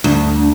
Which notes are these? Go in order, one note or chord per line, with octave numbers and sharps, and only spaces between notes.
D2